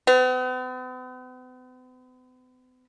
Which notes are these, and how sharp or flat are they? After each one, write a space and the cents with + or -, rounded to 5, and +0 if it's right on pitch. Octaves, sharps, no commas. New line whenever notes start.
B3 +45